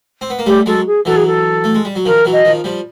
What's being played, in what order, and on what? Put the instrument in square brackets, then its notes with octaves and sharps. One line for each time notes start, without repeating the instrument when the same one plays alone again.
[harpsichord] C4
B3
A#3
[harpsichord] G3 A3 [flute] G4
[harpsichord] F#3 G#3 [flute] A4
[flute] G#4
[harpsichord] E3 F#3 [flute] A4
[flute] G#4
A4
[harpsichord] A3
G#3
G3
F#3
[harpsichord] D#3 F3 [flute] A#4
[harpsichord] E3 F#3
[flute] D#5
[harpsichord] D#3 F3
F3 G3